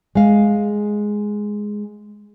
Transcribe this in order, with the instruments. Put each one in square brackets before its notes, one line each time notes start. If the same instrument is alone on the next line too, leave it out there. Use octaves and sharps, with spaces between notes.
[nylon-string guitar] G#3 F5